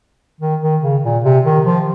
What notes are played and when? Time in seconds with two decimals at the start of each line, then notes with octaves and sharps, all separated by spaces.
0.41 D#3
0.62 D#3
0.82 C#3
1.03 A#2
1.24 C3
1.45 D#3
1.65 F3